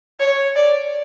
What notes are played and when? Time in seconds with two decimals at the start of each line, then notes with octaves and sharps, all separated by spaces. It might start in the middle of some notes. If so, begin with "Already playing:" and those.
0.20 C#5
0.55 D5